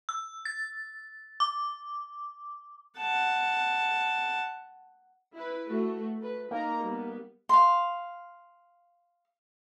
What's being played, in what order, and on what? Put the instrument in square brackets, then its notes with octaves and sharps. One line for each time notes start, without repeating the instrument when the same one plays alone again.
[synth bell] E6
A6
D6
[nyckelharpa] F#5 A5
[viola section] E4 B4
A3 F#4
A3 B4
[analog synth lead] A#3 [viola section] D#4 A#4 A#5
[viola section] G3 B3
[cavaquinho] F5 C6